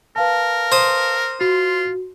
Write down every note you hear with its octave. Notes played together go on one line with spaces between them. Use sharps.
A#4 B4 F5 A5
C5 D#6
F4 F#4